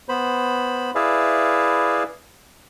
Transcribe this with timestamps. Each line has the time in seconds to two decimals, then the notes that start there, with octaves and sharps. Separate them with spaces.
0.09 B3 C5 B5
0.95 E4 G#4 B4 D5 E5 F5